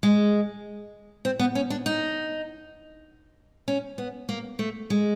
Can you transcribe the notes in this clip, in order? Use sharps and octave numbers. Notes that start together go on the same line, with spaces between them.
G#3
C4
B3
C#4
D4
D#4
C#4
B3
A#3
A3
G#3